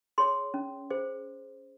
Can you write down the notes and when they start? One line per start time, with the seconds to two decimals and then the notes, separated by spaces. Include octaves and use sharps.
0.18 G#4 C#5 C6
0.54 C#4
0.90 G#4 C5